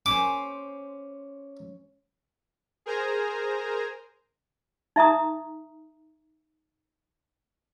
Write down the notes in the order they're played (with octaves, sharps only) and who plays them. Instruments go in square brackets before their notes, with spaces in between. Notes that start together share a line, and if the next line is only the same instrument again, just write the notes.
[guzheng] C#4 C5 [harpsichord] D6
[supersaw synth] G#4 A#4 C5 G#5 A#5
[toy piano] D#4 E5 A#5 D#6